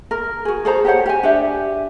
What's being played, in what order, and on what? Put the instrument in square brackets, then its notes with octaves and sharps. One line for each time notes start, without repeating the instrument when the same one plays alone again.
[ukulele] A#4
F#4 G#4
G#4 A4 C5 A#5
G4 C5 C#5 F#5
G4 G#5
D4 G4 E5